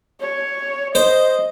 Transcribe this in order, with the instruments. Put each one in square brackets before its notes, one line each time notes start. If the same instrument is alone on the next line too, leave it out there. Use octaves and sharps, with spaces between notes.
[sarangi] C#5
[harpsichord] C5 [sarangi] D#5